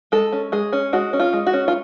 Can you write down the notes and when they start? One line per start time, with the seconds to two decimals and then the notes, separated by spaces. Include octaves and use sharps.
0.12 G#3 A4
0.32 C#4
0.52 G#3 G#4
0.73 C#4
0.93 G#3 F#4
1.13 C#4
1.20 F4
1.33 G#3
1.47 F#4
1.53 C#4
1.68 F4